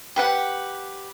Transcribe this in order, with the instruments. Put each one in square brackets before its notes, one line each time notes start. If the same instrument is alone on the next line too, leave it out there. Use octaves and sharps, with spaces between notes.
[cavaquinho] G4 B4 F#5